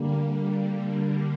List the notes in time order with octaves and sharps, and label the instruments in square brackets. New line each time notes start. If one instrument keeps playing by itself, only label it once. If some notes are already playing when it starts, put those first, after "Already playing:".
Already playing: [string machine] D3 G3 A#3